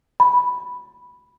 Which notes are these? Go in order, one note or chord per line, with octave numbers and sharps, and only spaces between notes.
B5